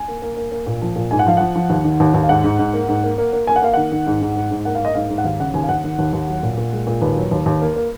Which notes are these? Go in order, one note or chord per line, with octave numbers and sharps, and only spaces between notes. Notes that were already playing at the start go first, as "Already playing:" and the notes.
Already playing: G#5
A#3
A#3
A#3
A#3
A#2
F3
A#2
G#2 G#5
F#5
F3 F5
F3 F#5
F3
D#2
D#3
D#2
D#2
F5
G#2 F#5
G#2
G#2
A#3
G#2
A#3
A#3
A#3
A#3 G#5
F#5
A#3 F5
D#3 F#5
D#3
G#2
G#2
G#2
G#2
A#3 F#5
F5
A#3 D#5
G#2 F5
G#2
F#5
D#2 F5
C#3 F#5
D#2 G#5
F5
D#2 F#5
D#3
D#2
D#2
F#3
A#2
A#2
G#3
A#2
D#2 B4
F#3
D#2
D#2
A#3
A#3